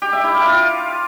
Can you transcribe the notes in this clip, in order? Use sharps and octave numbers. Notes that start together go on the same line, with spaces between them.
G4
E5
E4
F5
F4